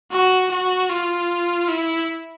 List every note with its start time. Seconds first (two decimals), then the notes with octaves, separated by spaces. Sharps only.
0.11 F#4
0.51 F#4
0.90 F4
1.69 E4